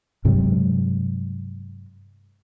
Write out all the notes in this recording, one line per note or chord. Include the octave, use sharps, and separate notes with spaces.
G2 C3 F#3 G#3